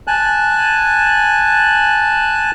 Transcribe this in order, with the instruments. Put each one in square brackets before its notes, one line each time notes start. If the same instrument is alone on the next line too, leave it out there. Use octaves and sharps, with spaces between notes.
[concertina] G#5 A5 F#6